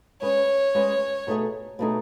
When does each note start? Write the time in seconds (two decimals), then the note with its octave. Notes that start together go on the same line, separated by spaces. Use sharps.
0.22 G#3 C#4 G#4 B4 C#5
0.75 G#3 C#4 G#4 B4
1.27 B2 A3 D#4 G#4
1.79 B2 A3 D#4 G#4